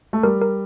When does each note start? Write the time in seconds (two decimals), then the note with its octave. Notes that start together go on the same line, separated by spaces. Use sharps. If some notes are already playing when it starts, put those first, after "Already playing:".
0.13 A3
0.23 G3 A#4
0.42 A#4